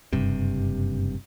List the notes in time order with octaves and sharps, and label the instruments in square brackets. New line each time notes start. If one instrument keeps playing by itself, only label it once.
[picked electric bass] F#1 G2 C3